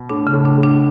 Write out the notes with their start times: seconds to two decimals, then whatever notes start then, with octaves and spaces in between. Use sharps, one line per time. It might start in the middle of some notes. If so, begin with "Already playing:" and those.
Already playing: B2
0.10 A2 D4
0.27 C#3
0.33 A2
0.45 D4
0.58 A2
0.63 D4